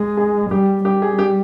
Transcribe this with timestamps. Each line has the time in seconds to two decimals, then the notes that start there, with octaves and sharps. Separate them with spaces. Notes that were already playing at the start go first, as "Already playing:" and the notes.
Already playing: G#3 G#4
0.17 G#4
0.50 G3 G4
0.85 G3 G4
1.02 G#4
1.19 G4